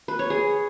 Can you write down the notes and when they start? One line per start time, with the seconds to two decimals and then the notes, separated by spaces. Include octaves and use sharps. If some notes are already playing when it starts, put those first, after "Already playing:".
0.08 B4
0.19 C#5
0.30 G#4